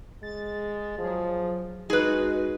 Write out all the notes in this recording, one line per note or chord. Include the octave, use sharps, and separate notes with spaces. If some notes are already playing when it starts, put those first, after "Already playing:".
G#3 A6
F3 F#3 G#4
G#3 D#4 F#4 G#4 B4